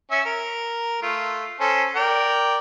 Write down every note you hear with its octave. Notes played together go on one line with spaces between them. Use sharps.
C#4 E5
A#4
A3 F4
C#4 A4 C5
A#4 D5 G5